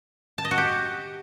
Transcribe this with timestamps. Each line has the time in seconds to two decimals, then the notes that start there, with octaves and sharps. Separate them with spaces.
0.38 A5
0.45 D#5
0.51 F#4
0.58 G4